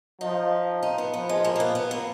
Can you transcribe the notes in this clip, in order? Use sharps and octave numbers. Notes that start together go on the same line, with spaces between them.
F3 D#4
D#4
B3
F3 B3
G#3
A#3
A#3
B3
B3
A#3